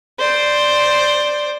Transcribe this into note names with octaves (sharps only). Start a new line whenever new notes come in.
C5 D5